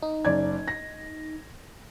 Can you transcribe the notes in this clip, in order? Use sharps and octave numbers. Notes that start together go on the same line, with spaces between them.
D#4
F#1 D5 G#6
A#6